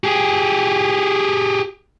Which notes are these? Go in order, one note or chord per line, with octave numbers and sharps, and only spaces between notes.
G4 G#4